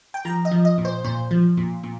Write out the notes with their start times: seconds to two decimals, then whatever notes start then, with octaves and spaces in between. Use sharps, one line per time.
0.14 G5
0.25 F3 A#5
0.45 D#5
0.52 F3
0.65 D#5
0.78 A#2
0.85 C5
1.05 A#2 C5
1.31 F3
1.57 A#2
1.84 A#2